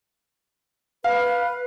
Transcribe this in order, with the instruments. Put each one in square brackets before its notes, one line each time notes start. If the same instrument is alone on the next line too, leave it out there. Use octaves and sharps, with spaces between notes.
[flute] B4 [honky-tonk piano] F5